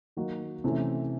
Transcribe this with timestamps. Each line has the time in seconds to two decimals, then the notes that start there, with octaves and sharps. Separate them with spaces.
0.17 D#3 F#3 A#3 D#4 F#4
0.64 C3 E3 A3 C#4